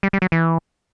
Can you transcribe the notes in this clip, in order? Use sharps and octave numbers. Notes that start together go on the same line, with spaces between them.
G3
G3
F#3
E3